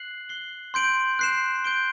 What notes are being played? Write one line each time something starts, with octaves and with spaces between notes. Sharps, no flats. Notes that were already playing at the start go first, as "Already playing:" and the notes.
Already playing: F#6 C7 F#7
F#6 C7 G7
C6 G6 D7 F#7
F#6 C7 E7
G6 D7 G7